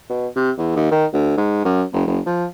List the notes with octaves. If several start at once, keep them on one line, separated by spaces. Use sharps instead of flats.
B2
C3
E2
D#2
D#3
D2
G#2
F#2
F#1
F#1
F3